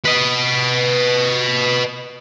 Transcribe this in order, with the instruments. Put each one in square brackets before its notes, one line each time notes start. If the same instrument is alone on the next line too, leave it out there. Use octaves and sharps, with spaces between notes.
[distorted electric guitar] B4 D#5